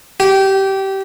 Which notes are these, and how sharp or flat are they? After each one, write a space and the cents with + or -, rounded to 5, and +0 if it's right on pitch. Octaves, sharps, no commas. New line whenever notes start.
G4 -20